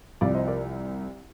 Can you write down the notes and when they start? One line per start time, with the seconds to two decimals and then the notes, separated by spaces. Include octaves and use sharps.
0.21 C2 C3 F3 D5 F5
0.34 C5 D#5
0.48 A#4 D5